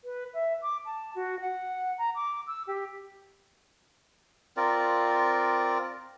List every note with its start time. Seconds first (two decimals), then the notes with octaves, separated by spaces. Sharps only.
0.04 B4
0.34 E5
0.62 D6
0.86 A5
1.15 F#4
1.40 F#5
1.98 A#5
2.15 D6
2.47 E6
2.67 G4
4.57 C4 F4 A#4 D5